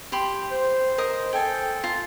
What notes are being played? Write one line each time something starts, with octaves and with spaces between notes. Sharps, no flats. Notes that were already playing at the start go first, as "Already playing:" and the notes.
G4 B5 C6
C5
A#4 D#5 D#6
A4 G5 G#5
F4 A#5